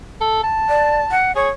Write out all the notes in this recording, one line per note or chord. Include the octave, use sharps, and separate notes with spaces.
A4
A5
D5
F#5
G#4 C#5